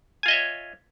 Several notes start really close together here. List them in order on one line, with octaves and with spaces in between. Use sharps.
G#5 F4 D#5 E5 C#5